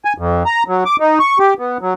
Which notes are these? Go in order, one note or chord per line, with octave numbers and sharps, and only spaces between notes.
G#5
F2
A#5
F#3
D6
D#4
C#6
G4
B3
F#3